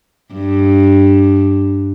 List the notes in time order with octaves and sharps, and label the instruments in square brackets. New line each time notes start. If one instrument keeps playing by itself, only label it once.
[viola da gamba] G2